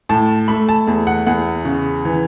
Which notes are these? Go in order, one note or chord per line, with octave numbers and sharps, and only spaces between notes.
A2 A5
A3 B5
A5
E2
F#5
E2 F#5
C#3
E3